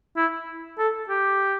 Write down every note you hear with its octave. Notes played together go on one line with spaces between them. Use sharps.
E4
A4
G4